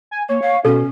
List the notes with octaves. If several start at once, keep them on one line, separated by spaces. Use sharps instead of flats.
G#5
A#3 C#5
F5
B2 C#4 A4